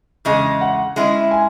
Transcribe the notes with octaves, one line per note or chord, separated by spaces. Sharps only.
E2 C#3 G#3 D#5
F#5
G#3 C#4 E4
G#5